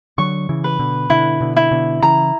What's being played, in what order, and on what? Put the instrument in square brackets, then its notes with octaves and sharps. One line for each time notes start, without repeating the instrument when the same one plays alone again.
[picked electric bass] D3 F#3 [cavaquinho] C#6
[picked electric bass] C#3 E3
[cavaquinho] B4
[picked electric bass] B2 D3
[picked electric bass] B2 D3 [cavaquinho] E4
[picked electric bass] B2 D3
[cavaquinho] E4
[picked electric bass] B2 D3
[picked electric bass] C#3 E3 [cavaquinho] A#5